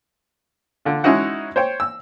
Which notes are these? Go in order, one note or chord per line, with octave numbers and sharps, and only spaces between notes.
D3 F4
G#3 C#4 D#4 E4 F#4 F#5
C5 C#5 G5
E6